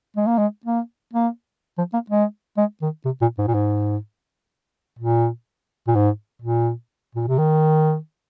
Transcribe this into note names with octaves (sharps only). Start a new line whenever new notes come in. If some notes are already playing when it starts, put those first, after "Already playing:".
G#3
A#3
G#3
A#3
A#3
F3
A#3
G#3
G#3
D#3
C3
A#2
G#2
A#2
G#2
A#2
A#2
G#2
A#2
A#2
C3
D#3